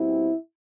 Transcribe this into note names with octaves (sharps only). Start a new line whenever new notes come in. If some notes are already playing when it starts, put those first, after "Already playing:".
Already playing: B2 G3 C4 E4